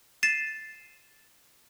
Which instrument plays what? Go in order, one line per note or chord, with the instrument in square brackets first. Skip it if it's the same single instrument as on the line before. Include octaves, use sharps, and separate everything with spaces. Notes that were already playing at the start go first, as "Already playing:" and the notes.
[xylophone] A6 C7 D#7 E7